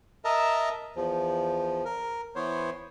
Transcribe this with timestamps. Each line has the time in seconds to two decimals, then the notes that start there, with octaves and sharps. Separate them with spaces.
0.25 A#4 D#5 E5 A5 A#5
0.96 E2 F3
1.85 A#4
2.36 E3 B3 C5 C#5